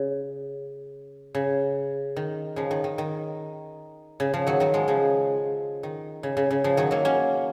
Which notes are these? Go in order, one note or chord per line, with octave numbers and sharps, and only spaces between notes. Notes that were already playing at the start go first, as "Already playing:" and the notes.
Already playing: C#3
C#3
D#3
C#3 F3
D#3
D#3
D#3
C#3
C#3 F3
D#3 F#3
D#3 F#3
F3 G#3
C#3 F3
D#3
C#3
C#3
C#3
C#3 F3
D#3 F#3
F#3 A#3
A#3 C#4